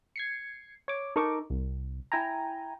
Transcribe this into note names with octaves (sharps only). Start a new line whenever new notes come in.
G#6 C7 C#7
C#5 D6
D#4 A4 A#4 C#6 D6
C2
E4 G5 G#5 A#5